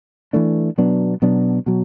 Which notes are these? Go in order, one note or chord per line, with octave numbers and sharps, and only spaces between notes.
E3 A3 D4
B2 F#3 B3 D4
B2 F#3 B3 D4
B2 F#3